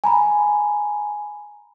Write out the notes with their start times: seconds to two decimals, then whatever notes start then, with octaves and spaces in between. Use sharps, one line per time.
0.04 G#5 A#5 B5